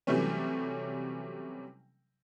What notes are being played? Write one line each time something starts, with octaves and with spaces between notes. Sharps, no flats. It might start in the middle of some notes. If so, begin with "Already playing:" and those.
C3 E3 F#3 G3 A3 C#4